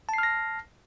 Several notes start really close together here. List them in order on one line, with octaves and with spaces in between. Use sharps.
A5 C7 F6 A#6